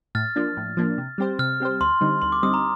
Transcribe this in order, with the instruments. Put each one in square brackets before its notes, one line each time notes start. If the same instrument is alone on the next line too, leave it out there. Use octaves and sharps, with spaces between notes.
[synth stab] A2 [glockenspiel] F6 A6
[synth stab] F3 A#3 D4
A2
F3 A#3 D4
C3
G3 C4 G4 C5
[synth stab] C3 [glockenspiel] F6
[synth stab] G3 C4 G4 C5
[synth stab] D2 [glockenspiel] C6
[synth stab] D3 G3 C4 D#4
[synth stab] D2 [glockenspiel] C6
[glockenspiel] D6
[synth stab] D3 G3 C4 D#4 [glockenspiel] D#6
[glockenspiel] A#5